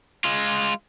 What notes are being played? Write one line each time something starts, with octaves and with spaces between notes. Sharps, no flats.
G#3 F4